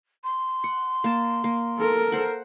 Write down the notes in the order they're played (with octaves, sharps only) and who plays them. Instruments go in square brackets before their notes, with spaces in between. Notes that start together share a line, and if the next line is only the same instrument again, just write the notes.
[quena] C6
[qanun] F#5
A#3 A5
A#3
[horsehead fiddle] A4 A#4
[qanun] C5 F#5